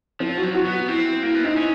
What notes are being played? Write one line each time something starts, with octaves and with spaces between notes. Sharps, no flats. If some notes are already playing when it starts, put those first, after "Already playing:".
F3 C4
F#4
F#3
F#4
B3
C4 E4
A#3 E4
B3
C4 D#4
C#4 E4